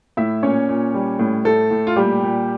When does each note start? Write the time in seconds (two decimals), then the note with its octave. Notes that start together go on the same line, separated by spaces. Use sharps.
0.17 A2 E4 E5
0.42 A#2 C#4 C#5
0.69 A#2
0.94 G3
1.19 A2
1.45 A2 A3 A4
1.71 A2
1.87 F4
1.96 A#2 G3 G4
2.22 A#2